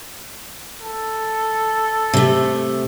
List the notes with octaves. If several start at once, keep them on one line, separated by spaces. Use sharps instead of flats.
A4
C3 A3